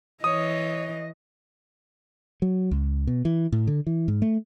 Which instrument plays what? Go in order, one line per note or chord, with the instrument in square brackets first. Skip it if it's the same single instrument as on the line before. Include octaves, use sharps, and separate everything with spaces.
[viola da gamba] E3 [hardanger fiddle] C#5 [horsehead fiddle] D#5 [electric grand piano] D#6
[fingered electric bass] F#3
C#2
B2
E3
A2
D3
E3
G#2
A3